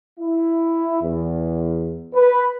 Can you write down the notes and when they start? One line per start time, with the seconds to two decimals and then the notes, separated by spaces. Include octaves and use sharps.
0.19 E4
1.02 E2
2.15 B4